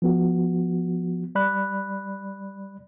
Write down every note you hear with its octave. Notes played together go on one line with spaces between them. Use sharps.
F3 B3 F#4
G3 D5 B5 F#6